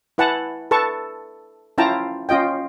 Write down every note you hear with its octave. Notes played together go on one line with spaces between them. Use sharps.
E4 B4 F#5 G#5 A5
A4 B4 A5 C#6
C#4 E4 F4 G5 A5 A#5
C#4 F4 D#5 G5